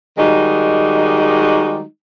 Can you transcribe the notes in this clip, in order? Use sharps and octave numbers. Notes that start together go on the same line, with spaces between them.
D#3 G3 G#3 D#4 F#4